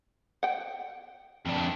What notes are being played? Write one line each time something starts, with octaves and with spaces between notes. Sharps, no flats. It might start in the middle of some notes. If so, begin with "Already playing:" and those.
F#5 G5
F2 D4